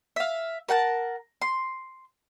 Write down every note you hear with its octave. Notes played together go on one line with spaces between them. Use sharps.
E5 F5
A#4 F#5 G5 A5
C6